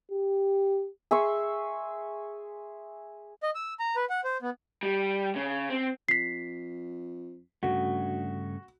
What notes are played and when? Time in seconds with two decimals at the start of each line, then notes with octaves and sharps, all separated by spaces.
0.12 G4
1.11 G#4 E5 C6 C#6
3.43 D#5
3.55 E6
3.80 A#5
3.96 B4
4.10 F#5
4.24 C5
4.42 B3
4.83 G3
5.36 C#3
5.70 C4
6.09 F2 B6 C7
7.63 D2 G2 C#3 A3 F#4